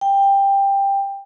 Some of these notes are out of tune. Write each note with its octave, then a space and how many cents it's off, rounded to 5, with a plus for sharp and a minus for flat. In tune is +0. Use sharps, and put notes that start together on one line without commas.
G5 +15